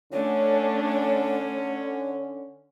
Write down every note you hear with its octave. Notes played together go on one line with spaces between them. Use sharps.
D3 A3 C#4 D4 C#5